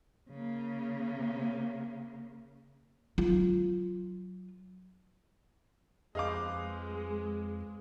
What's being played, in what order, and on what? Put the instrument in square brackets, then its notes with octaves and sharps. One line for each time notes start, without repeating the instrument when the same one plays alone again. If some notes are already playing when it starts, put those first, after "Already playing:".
[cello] C#3 A#3
[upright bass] F#3 F4
[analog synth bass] F2 [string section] G#3 [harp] G#4 B4 C5 [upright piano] D#5 F5 D6